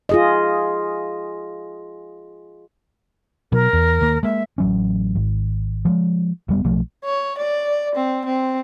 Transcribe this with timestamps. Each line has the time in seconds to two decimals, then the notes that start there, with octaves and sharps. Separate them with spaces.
0.09 F4 G#4 D#5
3.52 B2 F#3 A#4
3.73 E2
4.01 D#2 A#3
4.23 G#3 A#3 E5
4.58 A1 F#3 C#4
5.15 G#1
5.85 F3 G3 G#3
6.49 F1 G3 B3
6.64 B1 F3 A3
7.05 C#5
7.38 D5
7.95 C4
8.25 C4